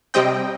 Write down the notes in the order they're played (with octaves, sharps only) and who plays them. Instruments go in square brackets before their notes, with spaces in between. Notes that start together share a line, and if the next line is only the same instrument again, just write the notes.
[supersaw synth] C3 G3 C4 D#5 G5